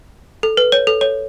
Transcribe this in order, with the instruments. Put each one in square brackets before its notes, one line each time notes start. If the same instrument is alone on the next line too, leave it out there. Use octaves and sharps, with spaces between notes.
[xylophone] A4
B4
C#5
A4
C#5